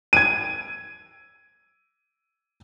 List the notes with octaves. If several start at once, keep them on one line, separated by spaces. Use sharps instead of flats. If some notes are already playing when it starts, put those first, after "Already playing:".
G#6 D7 D#7